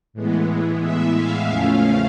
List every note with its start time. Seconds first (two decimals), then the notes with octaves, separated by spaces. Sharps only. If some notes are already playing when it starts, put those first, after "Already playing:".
0.13 A2 E3 G#3 B3
0.81 E5
1.15 F5
1.48 E2 C#3 F3 A3 C#4